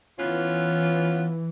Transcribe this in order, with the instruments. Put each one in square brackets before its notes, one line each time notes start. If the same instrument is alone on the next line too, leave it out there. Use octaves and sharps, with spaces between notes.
[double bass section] E3 [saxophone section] B3 C#4 F4